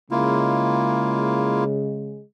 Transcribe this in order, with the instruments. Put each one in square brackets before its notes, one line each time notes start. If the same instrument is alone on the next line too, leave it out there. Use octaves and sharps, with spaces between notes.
[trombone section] C#3 G#3 [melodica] A#3 E4 F4